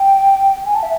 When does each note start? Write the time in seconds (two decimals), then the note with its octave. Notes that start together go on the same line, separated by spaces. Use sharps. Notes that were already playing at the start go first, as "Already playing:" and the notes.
Already playing: G5
0.65 G#5
0.75 A5
0.82 E5